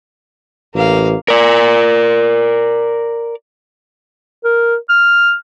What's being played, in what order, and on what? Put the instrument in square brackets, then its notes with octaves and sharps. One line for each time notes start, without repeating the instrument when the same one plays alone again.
[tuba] A1 [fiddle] A#3 F5
[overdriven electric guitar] A#4 D5
[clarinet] A#4
F6